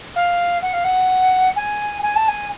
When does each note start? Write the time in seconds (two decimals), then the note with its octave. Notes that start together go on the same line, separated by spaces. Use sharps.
0.16 F5
0.62 F#5
0.73 F5
0.84 F#5
1.56 G#5
2.02 G#5
2.16 A5
2.28 G#5